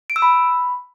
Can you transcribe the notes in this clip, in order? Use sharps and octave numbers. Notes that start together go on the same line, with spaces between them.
D7
E6
B5